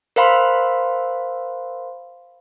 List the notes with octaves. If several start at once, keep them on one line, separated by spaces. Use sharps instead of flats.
A#4 C5 F5 B5 C6